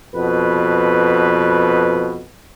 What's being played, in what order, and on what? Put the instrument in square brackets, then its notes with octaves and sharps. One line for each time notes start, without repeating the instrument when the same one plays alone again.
[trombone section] F2 B2 B4